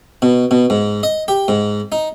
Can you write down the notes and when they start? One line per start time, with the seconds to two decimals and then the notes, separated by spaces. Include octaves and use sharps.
0.22 B2
0.51 B2
0.70 G#2
1.03 D#5
1.28 G4
1.48 G#2
1.92 D#4